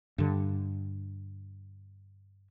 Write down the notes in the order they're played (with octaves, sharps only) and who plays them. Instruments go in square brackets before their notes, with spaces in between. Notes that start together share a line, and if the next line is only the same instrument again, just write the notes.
[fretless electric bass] G2 D3